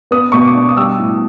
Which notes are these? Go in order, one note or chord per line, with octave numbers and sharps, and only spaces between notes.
B3 D#6
B2 C#6
D6
D4
D#6
G3 E6
A2